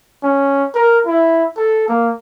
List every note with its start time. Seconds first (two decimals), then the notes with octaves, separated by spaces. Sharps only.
0.23 C#4
0.75 A#4
1.06 E4
1.57 A4
1.88 A#3